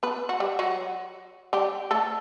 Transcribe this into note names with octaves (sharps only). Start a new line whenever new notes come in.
B3 B4
F#4
G3 G4
F#3 F#4
G3 G4
A3 A4